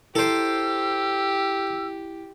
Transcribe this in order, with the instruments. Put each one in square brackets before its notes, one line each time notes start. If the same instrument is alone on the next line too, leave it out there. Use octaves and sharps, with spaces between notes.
[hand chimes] E4 D7 [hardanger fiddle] G4 [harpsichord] A4 C5 [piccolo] E6